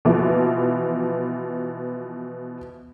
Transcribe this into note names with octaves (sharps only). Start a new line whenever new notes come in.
B2 E3 F3